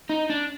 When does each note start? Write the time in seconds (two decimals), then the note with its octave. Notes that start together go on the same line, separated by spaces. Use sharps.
0.09 D#4
0.30 D4